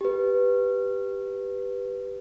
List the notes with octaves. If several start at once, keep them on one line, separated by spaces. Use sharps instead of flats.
G4 B4